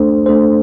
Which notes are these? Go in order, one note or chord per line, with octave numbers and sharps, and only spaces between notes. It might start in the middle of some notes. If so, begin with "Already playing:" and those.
Already playing: A3 D4 A4 C5
A3 D4 A4 C5